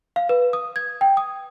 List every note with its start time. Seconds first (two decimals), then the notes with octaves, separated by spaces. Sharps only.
0.16 F5
0.29 B4
0.53 D#6
0.76 G#6
1.01 G5
1.17 D#6